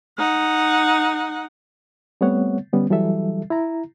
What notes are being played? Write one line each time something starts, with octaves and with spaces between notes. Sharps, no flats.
D#4 F#5
G3 A3 B3 C4 C#5 F#5
D3 G3 B3 C#4
E3 F#3 G3 A4 E5
E4 A#5